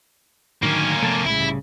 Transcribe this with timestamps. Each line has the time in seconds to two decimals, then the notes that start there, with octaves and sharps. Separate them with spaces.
0.63 A2 D3 D#3 F#3 A#3 C#4
1.02 C3 F3 A3 B3 A5
1.26 A#1 A2 C#3 G#3 E4
1.40 C2 A2 G3